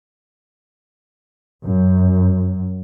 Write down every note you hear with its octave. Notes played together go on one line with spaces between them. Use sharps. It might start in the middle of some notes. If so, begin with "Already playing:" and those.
F#2